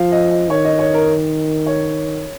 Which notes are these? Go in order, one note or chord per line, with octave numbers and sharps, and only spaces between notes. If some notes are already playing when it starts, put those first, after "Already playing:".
Already playing: F3 F5
D#5
D#5
D#3 C#5
D#5
C#5
A#4
C#5